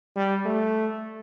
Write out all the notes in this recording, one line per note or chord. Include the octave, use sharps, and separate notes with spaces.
G3
A3